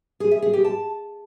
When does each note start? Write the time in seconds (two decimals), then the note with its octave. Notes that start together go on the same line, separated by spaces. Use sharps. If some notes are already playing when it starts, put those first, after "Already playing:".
0.20 G#4
0.31 E5
0.42 G#4
0.53 G4
0.64 A5